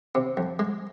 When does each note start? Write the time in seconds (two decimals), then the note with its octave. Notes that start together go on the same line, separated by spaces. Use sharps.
0.15 C3
0.37 F2
0.59 G#3